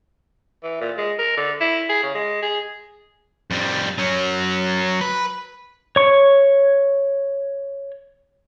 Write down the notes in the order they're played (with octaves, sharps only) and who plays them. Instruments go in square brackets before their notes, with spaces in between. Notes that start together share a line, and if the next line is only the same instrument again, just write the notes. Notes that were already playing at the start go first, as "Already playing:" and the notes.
[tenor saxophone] E3
A#2
G#3
A#4
D3
E4
G#4
C#3
G#3
G#4
[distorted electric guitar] F2 G3
F#3 C#4
B4
[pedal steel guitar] C#5 C#6